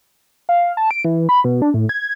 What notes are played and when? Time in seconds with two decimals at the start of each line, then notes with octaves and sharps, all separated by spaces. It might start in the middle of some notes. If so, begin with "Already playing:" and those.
0.49 F5
0.77 A5
0.91 D7
1.05 E3
1.29 B5
1.44 B2
1.62 D4
1.74 A2
1.89 G#6